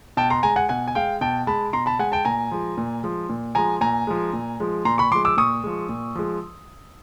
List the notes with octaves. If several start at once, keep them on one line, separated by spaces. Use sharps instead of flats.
B2 G5 A5
A#5 C6
G#3 G#5 A#5
F#5 G#5
B2 F#5 G#5
G#5
G#3 F5 G5
B2 G5 A5
G#3 A5 B5
B2 A#5 C6
A5 B5
G#3 F#5 G#5
G5 A5
A#2 G#5 A#5
F3 G#3
A#2
F3 G#3
A#2
F3 G#3 G#5 A#5
A#2 G#5 A#5
F3 G#3
A#2
F3 G#3
A#2 A#5 C6
B5 C#6
F3 G#3 C6 D6
D6 E6
A#2 C#6 D#6
F3 G#3
A#2
F3 G#3